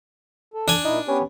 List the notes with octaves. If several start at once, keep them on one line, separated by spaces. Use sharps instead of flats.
A4
D4 G#5
A#2 D#4 E4
B3 C#4 G4 B4